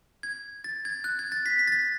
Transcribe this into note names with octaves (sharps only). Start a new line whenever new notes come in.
G#6
A6
G#6
F#6
G#6
A6
B6
B6
A6
B6